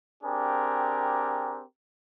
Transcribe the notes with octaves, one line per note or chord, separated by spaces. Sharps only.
C4 D4 G4 G#4 A#4